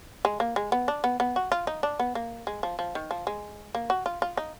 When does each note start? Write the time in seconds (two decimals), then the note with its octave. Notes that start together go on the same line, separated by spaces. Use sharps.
0.25 G#3
0.40 A#3
0.56 G#3
0.72 B3
0.88 D4
1.04 B3
1.20 B3
1.36 F#4
1.52 F4
1.67 D#4
1.83 D4
1.99 B3
2.15 A#3
2.47 G#3
2.63 F3
2.79 F3
2.95 D#3
3.11 F3
3.27 G#3
3.75 A#3
3.90 F#4
4.06 F4
4.22 F4
4.37 D#4